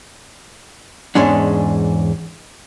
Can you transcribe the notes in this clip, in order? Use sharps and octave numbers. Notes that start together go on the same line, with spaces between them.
E2 G#2 G#3 C#4 D4